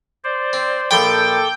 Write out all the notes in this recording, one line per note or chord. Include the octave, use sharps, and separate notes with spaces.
C5 D5
C4
A#1 F3 A4 G5 B5 D6